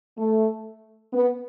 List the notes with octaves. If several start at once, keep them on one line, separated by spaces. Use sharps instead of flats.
A3
B3